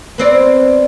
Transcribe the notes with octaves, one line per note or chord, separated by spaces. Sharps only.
B3 C4 D5